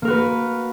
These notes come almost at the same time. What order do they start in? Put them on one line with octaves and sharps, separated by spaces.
A#3 A#4 F#4 B4